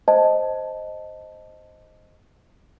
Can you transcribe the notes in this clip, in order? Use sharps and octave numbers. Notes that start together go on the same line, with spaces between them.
C5 D#5 A5